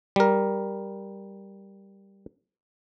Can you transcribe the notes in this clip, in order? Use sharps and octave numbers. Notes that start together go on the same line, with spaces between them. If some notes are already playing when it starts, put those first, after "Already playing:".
G3 A#4